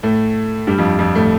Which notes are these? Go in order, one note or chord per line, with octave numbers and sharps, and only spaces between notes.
A2 A3
G2 G3
F2 F3
F2 F3
A2 A3